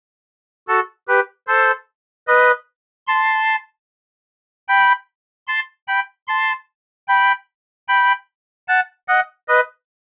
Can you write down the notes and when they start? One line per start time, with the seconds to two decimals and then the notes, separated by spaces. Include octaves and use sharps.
0.68 F#4 A4
1.08 G4 B4
1.47 A4 C5
2.27 B4 D#5
3.08 A5 C6
4.68 G5 B5
5.48 A5 C6
5.88 G5 B5
6.28 A5 C6
7.08 G5 B5
7.88 G5 B5
8.68 F#5 A5
9.08 D#5 F#5
9.48 B4 D#5